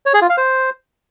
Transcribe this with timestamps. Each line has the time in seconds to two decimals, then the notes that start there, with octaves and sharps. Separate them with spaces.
0.06 C#5
0.14 G#4
0.22 F4
0.29 F5
0.37 C5